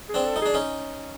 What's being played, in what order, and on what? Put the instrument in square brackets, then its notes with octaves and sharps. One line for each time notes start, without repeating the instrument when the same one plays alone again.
[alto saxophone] G#4
[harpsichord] C4 D4
[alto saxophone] A4
[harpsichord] D#4
[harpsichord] D4 [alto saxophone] G#4
[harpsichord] C#4 D#4